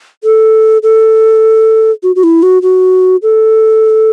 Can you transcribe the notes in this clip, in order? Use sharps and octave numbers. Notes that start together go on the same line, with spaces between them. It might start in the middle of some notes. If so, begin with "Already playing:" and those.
A4
A4
F#4
F#4
E4
F#4
F#4
A4